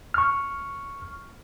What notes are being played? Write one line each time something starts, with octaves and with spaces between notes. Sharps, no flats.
C#6 F6